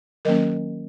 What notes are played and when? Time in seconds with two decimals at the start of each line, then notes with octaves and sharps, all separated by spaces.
0.25 D#3 F#3 A#3 C#4 A#4 D#5